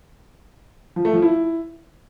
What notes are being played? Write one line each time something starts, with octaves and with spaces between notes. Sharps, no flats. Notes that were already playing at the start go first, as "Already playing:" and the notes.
F3
A3
F3
E4